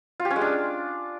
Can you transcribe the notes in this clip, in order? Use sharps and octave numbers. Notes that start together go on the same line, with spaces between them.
F4
G4
C#4
G#3
D4